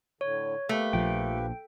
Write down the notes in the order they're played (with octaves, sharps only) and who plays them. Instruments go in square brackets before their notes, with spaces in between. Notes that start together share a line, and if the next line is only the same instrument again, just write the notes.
[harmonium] A2 D3 [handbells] C#5
[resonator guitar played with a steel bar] A3 [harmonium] A#3 G4 B4
[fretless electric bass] A#1 F3 [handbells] G5